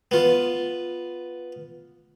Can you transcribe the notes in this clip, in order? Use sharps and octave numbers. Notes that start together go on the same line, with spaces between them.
B3 F4